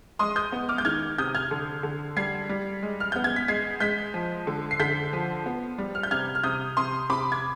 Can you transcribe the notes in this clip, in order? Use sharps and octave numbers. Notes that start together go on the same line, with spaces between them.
G#3 C6 D#6
D#6 G6
B3
D6 F6
G6
D#3 F6 G#6
C3 D#6 G6
F6 G#6
D3
D3
G3 G#6 C7
G3
G#3
F6
B3 G6
G#6
B6
G#3 G#6 C7
G#3 G6 B6
F3
D3
C7
D3 G6 B6
F3
B3
G3
F6
G6
C3 F6 G#6
F6
C3 D#6 G6
C3 C6 D#6
C3 B5 D6
G#6